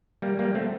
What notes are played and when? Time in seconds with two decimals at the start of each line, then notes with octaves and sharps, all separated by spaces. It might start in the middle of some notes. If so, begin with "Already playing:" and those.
0.22 G3 A#3
0.39 G3 A#3
0.55 A3 C4